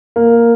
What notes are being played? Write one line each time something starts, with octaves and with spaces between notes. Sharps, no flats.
A#3